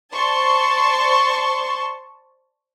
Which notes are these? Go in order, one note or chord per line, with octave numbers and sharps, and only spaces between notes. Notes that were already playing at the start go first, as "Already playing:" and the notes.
C5 D5 A5 C6 C#6